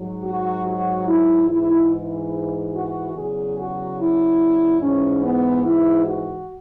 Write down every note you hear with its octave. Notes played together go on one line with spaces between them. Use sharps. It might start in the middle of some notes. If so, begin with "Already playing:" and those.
Already playing: G#2 F#3
F#4
F#4
E4
G#2 E3 E4
F#4
E2 C#3 F#3 G#4
F#4
E4
G#2 E3 C#4
B3
E4
F#4